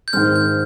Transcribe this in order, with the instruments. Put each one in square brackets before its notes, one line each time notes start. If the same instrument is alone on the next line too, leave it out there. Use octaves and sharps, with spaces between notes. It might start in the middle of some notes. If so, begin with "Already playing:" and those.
[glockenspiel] G6
[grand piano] G#2 D#3 G#3 C4 [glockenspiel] F6
[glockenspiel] G6